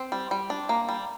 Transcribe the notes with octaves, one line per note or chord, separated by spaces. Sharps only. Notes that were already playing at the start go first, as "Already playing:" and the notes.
Already playing: C4 C5
G3
G3
D4
A#3
G3